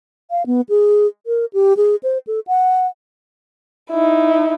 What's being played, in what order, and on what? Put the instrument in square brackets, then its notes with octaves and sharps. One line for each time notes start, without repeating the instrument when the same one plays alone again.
[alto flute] F5
B3
G#4
A#4
G4
G#4
C5
A4
F#5
[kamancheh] D#4 E4